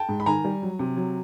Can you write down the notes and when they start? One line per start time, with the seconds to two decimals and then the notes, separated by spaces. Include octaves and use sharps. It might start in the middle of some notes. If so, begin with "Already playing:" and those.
Already playing: G5 A5
0.09 G#2
0.20 B5
0.26 D#3 G#5 A#5
0.44 G3
0.62 F#3
0.79 C3
0.97 F#3